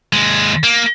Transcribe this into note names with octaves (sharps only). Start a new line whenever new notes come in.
D#2 G#3
A#3